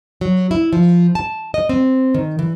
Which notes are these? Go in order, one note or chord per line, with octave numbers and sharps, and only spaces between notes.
F#3
E4
F3
A5
D#5
C4
D#3
E3